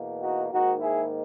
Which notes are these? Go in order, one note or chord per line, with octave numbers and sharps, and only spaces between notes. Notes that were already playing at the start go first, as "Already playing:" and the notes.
Already playing: E2 B2 A#3
D#4 F#4
G#2 D#3 A#3 D#4 F#4
E4 G#4